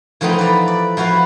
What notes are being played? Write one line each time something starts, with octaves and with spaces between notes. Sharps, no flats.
E3 F3 A3 B3 C4 D#4
B4 D5 A#5
D5
F3 E4 F#4 B4 F5